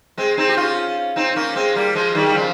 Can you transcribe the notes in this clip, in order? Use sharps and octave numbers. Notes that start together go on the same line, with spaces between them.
G#3 C4
C4 D#4
G4
C#4 F4
C4 D#4
A#3 C#4
G#3 C4
G3 A#3
F3 G#3
D#3 G3
G3
C#3 F3